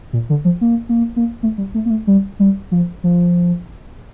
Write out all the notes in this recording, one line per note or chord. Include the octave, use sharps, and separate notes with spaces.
A#2
D3
F3
A#3
A#3
A#3
A3
G3
A3
A#3
A3
G3
G3
F3
F3